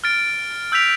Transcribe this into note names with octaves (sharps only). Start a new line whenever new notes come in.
F6 A6 D7
E6 G6 B6 D7 F7